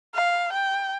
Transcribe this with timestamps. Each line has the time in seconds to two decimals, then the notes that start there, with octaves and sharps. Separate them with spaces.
0.15 F5
0.53 G5